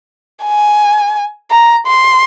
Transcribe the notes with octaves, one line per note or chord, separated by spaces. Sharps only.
G#5
A#5
C6